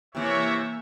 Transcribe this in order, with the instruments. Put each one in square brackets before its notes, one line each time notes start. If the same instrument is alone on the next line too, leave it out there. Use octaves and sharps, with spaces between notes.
[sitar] C3 E3 [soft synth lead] A#3 [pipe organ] C#5 E5